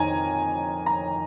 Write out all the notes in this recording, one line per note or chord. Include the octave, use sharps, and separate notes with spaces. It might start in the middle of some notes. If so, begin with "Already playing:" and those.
Already playing: F2 D#3 G#5 A#5
A#5